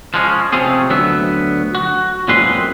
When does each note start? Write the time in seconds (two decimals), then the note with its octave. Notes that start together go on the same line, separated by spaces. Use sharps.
0.14 F3 G#3 C#4
0.53 C3 F3 A3 C4 C#4 G#4
0.90 D2 F#3 B3 E5
1.75 F#4
2.28 F#2 A#2 G#3 C4 B4 C6